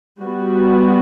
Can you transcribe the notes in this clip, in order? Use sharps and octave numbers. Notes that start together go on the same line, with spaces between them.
G3 B3 F#4